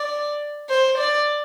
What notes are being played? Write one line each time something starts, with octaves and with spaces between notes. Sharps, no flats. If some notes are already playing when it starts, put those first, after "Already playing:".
Already playing: D5
C5
D5